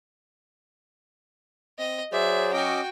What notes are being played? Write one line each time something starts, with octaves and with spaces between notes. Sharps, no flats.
C4 D#5
F#3 G#4 C5 D5 E5
C#4 F#4 D#5 G5 D6